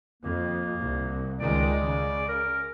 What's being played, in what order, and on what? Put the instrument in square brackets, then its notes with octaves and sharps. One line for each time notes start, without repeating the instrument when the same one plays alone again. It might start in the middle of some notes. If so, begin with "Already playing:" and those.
[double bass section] F2 [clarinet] A#3
[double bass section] C2
[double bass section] C#2 D#3 G#3 [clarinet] D5
[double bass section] C#3
[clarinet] A#4